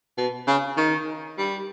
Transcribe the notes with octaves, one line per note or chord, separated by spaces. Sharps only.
B2
C#3
D#3
G3